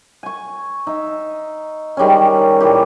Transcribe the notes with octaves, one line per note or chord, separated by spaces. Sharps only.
G#5 C#6
D#4 E5
D#3 G3 G#3 C#4
A#2 E3 G4